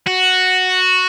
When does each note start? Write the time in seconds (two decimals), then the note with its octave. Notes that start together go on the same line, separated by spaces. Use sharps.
0.07 F#4